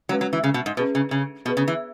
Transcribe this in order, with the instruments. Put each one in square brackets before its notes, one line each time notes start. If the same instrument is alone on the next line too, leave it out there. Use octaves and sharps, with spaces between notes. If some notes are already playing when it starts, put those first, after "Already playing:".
[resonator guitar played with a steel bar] F#3 [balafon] G#3 C#4 F#4 B4
[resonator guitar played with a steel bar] F#3
E3
C#3
B2
G#2
[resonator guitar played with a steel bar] B2 [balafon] C#4 G#4 B4
[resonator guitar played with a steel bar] C#3
C#3
[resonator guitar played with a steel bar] B2 [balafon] B3 G#4 B4
[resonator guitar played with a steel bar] C#3
E3